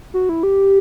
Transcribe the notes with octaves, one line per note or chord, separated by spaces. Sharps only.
F#4
E4
G4